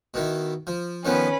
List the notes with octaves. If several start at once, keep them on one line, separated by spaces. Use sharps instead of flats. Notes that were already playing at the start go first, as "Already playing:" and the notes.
B2 D#3 E4
F3
D#3 F3 B3 C#4 B4